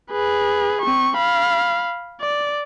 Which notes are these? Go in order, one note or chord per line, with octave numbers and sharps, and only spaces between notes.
G#4 B4
C4 C#6
F5 B5
D5